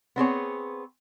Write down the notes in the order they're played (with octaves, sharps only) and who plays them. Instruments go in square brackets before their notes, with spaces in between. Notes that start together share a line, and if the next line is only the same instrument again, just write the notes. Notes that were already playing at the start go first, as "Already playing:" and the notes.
[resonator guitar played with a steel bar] B3 C4 G#4 C#5